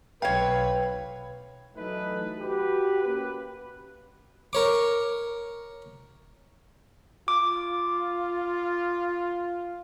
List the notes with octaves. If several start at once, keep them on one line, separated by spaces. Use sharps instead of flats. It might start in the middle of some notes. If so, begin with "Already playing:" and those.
B1 B4 C#5 F5 G5
E3 F#3 A3 D#4 A4 B4
F#4 G4 B4
A#3 C#4 G4 B4
A#4 C#5 D6
F4 D6